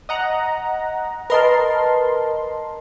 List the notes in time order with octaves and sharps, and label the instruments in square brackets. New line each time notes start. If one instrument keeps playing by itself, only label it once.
[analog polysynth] D#5 F#5 A#5
[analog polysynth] A#4 C6 [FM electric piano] B4 D#5 A5